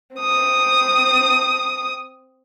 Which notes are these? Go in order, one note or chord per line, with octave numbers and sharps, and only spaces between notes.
C4 D#6